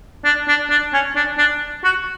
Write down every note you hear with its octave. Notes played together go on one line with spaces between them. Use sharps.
D4
D4
D4
C#4
D4
D4
F#4